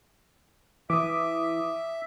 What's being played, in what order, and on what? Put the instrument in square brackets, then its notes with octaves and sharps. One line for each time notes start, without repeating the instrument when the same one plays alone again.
[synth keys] E3 [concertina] E5 [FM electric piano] D6 D#6